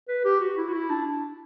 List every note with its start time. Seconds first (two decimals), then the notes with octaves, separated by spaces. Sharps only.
0.08 B4
0.25 G4
0.41 F#4
0.57 E4
0.69 F#4
0.73 E4
0.90 D4